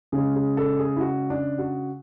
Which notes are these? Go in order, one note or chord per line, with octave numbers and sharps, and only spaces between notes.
C#3 G#3 G#4
G#4
A4
G#4
E4
F#4
D4
F#4